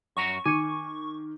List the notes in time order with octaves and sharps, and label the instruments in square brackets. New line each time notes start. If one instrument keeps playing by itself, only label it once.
[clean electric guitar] F#2 F#4 A#5 [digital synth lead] C#6
[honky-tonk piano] D#3 [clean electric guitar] G#5 [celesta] D6 G#6 C#7